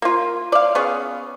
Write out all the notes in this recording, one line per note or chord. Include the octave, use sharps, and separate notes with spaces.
A#3 F4
D5 F5
B3 C#4 G#4